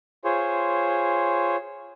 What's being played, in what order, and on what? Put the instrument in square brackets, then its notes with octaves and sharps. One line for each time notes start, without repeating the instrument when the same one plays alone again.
[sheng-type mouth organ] F4 G#4 C5 C#5